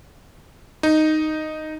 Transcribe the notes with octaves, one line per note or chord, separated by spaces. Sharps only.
D#4